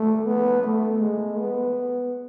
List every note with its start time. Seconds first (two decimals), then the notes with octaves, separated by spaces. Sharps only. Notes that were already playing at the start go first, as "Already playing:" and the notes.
Already playing: A3
0.26 B3
0.63 A3
1.00 G#3
1.38 B3